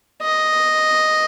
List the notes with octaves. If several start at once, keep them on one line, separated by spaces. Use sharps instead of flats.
D#5